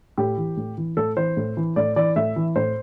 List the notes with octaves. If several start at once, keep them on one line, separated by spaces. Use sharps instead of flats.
A2 G4
E3
A2
E3
A2 A4
E3 C5
A2
E3
A2 D5
E3 D5
A2 E5
E3
A2 C5